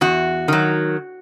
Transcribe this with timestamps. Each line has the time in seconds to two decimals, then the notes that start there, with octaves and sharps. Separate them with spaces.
0.01 E2 F#4
0.48 D#3 F#3